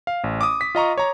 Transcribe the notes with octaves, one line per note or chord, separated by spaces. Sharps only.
F5
A1
D6 D#6
B6
F4 D#5 A#5 C#6
C#5 A#5